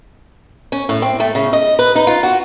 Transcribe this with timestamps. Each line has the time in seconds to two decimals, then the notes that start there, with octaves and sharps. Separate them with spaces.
0.72 C#4
0.89 A2
1.02 C4
1.20 A3
1.35 C#3
1.53 D#5
1.79 B4
1.95 D#4
2.07 F4
2.23 F#4